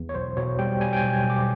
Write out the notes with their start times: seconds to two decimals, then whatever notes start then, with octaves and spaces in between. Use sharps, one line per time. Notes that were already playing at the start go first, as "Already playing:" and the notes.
Already playing: E2
0.09 C#5
0.14 B1 C5
0.37 B2 C#5
0.59 G3 G5
0.80 G3 G#5
0.93 G5
0.97 G#5
1.03 B1
1.13 G#5
1.24 B1
1.30 D6